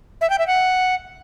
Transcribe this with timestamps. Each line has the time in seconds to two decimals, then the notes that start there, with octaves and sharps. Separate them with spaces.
0.21 E5
0.30 G5
0.39 E5
0.47 F#5